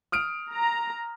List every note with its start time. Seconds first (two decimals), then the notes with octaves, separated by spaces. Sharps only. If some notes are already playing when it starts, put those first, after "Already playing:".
0.12 D#6 F6 D7
0.50 A#5